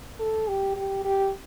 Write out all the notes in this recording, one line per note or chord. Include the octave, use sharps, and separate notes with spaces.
A4
G4
G4
G4